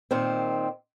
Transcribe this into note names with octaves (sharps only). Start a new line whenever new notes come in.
A#2 D#3 C4